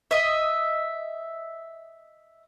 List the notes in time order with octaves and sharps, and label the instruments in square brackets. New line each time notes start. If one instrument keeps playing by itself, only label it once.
[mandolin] D#5 E5